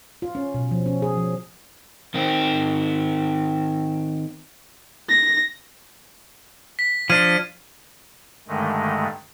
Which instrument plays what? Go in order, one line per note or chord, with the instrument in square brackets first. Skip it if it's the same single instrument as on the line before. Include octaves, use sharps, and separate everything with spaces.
[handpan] F4
C#4
B2
F3
C#4
G#4
F3
[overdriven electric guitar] D#3 C4
[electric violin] A#6
[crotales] B6
[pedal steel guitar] F3 D4 [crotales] F6 G#6 D#7
[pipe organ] G2 D3 D#3 G#3 A3